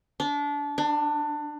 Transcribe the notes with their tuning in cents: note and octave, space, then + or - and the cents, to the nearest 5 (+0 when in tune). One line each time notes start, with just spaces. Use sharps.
D4 -25
D4 +20